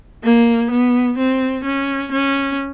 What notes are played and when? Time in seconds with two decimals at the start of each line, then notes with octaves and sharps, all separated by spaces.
0.24 A#3
0.71 B3
1.18 C4
1.65 C#4
2.12 C#4